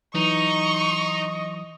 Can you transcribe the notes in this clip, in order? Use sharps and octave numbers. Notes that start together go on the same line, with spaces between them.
E3 F#3 D#4 D#5 C#6